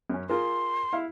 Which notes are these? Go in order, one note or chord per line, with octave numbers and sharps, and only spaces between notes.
F#2 C#4
F4 G#4 A#4 C6
E4 F5